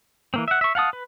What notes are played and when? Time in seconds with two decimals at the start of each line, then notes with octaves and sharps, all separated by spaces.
0.34 E3 A#3 C4
0.48 E5 F#5
0.61 E5 C#6
0.75 F5 F#5 A5 D#6
0.93 B4